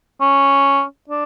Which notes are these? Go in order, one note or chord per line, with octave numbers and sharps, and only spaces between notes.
C#4
D4